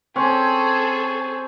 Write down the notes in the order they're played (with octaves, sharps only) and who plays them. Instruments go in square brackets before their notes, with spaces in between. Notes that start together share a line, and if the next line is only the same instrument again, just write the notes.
[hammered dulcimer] C4 [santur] C#4 [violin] G#4 A4